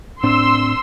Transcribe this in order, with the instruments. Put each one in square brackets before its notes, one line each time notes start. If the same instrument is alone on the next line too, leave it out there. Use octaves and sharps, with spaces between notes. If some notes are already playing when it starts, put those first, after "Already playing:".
[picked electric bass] A2 C4 D4 [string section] C6 E6